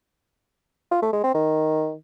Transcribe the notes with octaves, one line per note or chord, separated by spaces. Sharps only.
F4
A3
G#3
C4
D#3